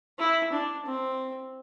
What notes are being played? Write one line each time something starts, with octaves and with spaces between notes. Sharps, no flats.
E4
D4
C4